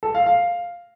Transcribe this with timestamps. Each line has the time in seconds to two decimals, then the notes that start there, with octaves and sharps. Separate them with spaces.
0.03 A4
0.15 F5
0.26 F5